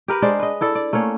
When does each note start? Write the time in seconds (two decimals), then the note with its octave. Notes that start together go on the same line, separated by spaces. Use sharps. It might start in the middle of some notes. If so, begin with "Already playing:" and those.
0.08 G4 A#4 B4
0.22 G#3 D4 C5 D5
0.39 B4 D#5
0.61 D4 E4 A4 D5
0.75 D5
0.93 A3 A#3 C#4 C#5